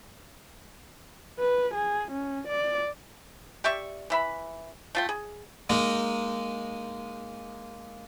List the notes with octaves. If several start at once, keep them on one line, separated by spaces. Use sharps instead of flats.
B4
G#4
C#4
D5
G4 D5 E5 C#6
E3 E5 B5
A3 F4 G5
G#4
G#3 A#3 D#4